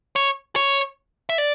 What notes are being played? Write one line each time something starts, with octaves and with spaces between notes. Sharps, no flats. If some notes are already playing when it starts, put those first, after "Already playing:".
C#5
C#5
E5
D5